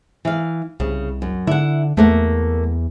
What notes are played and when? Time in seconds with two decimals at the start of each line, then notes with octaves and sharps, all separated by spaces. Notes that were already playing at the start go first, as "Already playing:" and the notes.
0.25 E3 F5
0.80 C2 C#3
1.22 F#2
1.47 D3 E4 F#5
1.97 E2 A3 A#3 F#5